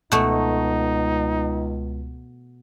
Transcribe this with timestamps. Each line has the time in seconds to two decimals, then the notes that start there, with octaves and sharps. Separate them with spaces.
0.12 C#2 B2 A3 D#4